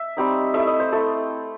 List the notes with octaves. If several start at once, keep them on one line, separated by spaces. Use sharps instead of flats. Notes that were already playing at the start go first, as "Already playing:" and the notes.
Already playing: E5
G3 C4 D#4
A3 E4 E5
D#5
C5
A3 E4 A4